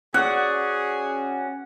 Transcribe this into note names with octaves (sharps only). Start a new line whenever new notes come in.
C#4 F#4 G#4 D5 F#5